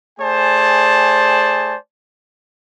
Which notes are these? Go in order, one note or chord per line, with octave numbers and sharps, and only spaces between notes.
A3 G#4 C5 D5 G#5 A5